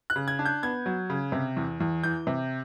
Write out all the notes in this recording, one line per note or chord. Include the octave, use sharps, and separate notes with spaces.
F#6
C#3
G#6
D4
G6
B3 G#6
F#3
C#3
C3
E2
E2
E3 G6
C3